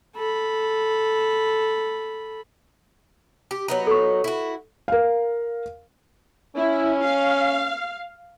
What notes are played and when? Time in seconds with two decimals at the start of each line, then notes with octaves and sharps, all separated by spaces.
0.16 A4 B5
3.51 G4
3.68 F#3 B3 D#4
3.87 A4 C#6
4.24 E4 F#4
4.88 A#4 F5
6.56 C#4 E4
7.04 F5